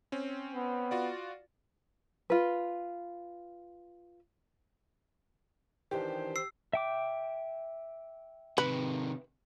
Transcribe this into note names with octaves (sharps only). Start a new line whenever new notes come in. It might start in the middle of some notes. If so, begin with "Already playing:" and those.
C4 C#4
B3
F4 F#4 D5
F4 B4
D#3 E3 D4 G4 C5
E6 C7
E5 G5 D6
C3 D#3 B4